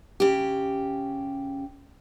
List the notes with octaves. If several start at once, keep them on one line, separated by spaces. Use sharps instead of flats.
C#3 G4